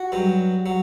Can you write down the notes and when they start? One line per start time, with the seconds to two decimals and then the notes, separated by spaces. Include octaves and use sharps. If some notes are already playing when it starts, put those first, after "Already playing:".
Already playing: F#4
0.12 G2 F#3
0.66 F#3